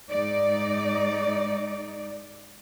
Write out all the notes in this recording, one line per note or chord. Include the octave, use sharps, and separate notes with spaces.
G#2 G#3 D#4 D5